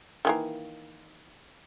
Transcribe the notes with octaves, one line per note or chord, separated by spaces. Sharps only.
D#3 E3 A#3